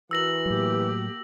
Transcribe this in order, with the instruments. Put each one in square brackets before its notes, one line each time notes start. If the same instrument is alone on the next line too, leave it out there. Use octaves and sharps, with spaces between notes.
[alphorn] E3 [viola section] F#4 A#4 [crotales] E6 A#6 F#7
[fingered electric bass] A2 F#3 [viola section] A#3 F#4 G4